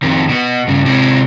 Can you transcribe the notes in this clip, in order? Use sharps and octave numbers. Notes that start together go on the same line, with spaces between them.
F2 D#3
B2 B3
G2 C#3
C3 G#3